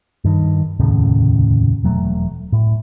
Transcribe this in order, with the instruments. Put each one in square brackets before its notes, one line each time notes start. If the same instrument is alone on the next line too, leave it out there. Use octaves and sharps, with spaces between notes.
[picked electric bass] G2 D#3
F1 D#2 A2 C#3
E1 F#3 A3
A2